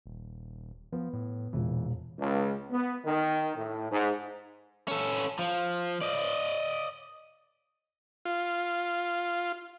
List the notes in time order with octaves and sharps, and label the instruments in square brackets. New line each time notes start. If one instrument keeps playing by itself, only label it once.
[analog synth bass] D#1
[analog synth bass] F3 [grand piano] B3
[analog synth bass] A2
[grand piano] E1 A#2 [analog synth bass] E3
[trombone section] C#2
B3
D#3
A2
G#2
[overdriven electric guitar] C#4 A4
F3
D5 D#5
[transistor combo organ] F4